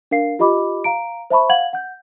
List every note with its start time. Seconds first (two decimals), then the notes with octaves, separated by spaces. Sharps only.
0.11 D4 A#4 F5 C7
0.39 F4 G4 D#5 B5 D6
0.84 F5 A#5 D7
1.30 C5 E5 A5 B5 C#6
1.49 F5 F#5 G#6 F#7
1.73 F#5 G6